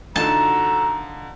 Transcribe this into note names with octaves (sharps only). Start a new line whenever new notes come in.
D2 D3 D#4 F4 F#4 A4 A5 A#5